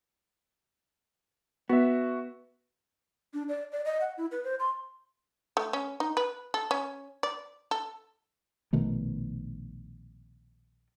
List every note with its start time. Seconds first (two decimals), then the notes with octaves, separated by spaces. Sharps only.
1.69 B3 F#4 E5
3.34 D4
3.49 D5
3.72 D5
3.85 D#5
4.01 F#5
4.18 E4
4.31 B4
4.44 C5
4.59 C6
5.57 A3
5.73 C#4
6.00 D#4
6.17 B4
6.54 A4
6.71 C#4
7.23 D5
7.71 A4
8.73 A#1 B2 D#3 A3